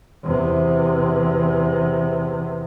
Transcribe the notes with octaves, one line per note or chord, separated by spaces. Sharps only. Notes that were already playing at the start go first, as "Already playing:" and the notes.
E2 C3